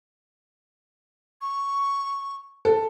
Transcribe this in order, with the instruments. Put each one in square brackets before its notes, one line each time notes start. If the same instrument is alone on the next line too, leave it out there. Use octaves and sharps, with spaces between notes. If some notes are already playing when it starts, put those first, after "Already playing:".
[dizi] C#6
[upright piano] A4